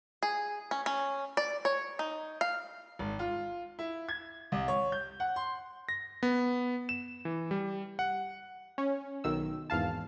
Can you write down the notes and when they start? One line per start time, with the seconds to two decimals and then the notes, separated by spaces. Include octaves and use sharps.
0.23 G#4
0.71 C#4
0.86 C#4
1.37 D5
1.65 C#5
1.99 D#4
2.41 F5
2.99 G#1
3.19 F4
3.79 E4
4.09 G#6
4.52 C2
4.68 C#5
4.92 G6
5.20 F#5
5.36 C6
5.89 A#6
6.23 B3
6.89 E7
7.25 E3
7.51 G3
7.99 F#5
8.78 C#4
9.24 B1 D#3 E6
9.70 G#1 E2 F5 A5